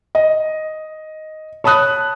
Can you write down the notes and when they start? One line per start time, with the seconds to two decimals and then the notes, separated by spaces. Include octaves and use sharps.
0.15 D#5
1.64 C#5 A5 B5 D#6 F#6